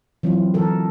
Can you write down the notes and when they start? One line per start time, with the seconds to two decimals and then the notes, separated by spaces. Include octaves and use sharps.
0.23 E3 F#3 C4 E4 F4
0.54 D3 E3 F#4 A4 A#4